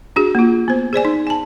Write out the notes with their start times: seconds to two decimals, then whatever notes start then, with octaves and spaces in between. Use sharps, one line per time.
0.16 D4 F#4 G#4
0.35 A#3 F4
0.68 B3 C5
0.93 G#4 C5 D5 G#5
1.05 D#4
1.27 G#5 A5